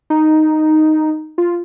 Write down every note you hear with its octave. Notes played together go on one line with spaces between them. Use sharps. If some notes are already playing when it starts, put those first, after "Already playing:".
D#4
F4